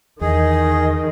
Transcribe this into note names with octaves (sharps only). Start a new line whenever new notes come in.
E2 D#3 G#4 D#5